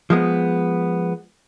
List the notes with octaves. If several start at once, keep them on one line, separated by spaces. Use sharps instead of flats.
F3 G#3 B3